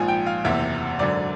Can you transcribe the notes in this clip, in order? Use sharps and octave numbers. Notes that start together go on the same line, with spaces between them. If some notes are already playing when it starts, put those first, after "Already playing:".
Already playing: A#1 G#2 F3 G#5
G5
F5
F#1 E2 C3 E5
G#1 F#2 D3 D5